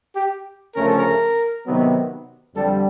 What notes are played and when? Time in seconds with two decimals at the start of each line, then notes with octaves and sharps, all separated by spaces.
0.16 G4
0.75 D2 C#3 F3 A3 C#4 A#4
0.87 A4
0.99 A#4
1.65 C3 D#3 F#3 B3
2.55 F2 D3 G3 A4